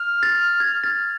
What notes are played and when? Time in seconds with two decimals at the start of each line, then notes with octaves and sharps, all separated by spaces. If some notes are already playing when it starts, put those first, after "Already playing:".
Already playing: F6
0.23 A6
0.60 G#6
0.84 A6